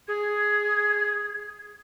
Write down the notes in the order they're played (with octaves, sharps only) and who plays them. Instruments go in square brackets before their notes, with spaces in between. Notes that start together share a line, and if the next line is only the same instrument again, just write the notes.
[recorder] G#4 [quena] G#6